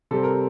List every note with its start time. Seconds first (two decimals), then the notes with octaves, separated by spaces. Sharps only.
0.11 C3 G3 C4 A4
0.23 A#4